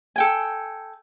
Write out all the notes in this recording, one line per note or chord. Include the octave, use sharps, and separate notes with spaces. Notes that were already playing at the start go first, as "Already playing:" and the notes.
A4 G5 G#5